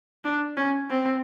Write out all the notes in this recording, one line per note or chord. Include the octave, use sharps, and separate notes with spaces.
D4
C#4
C4